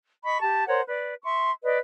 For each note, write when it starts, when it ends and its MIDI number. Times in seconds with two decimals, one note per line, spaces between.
0.24 0.40 75
0.24 0.40 83
0.24 0.40 85
0.41 0.64 67
0.41 0.64 81
0.66 0.80 70
0.66 0.80 72
0.66 0.80 73
0.66 0.80 78
0.87 1.14 71
0.87 1.14 74
1.23 1.51 76
1.23 1.51 84
1.23 1.51 85
1.63 1.77 71
1.63 1.77 74
1.63 1.77 75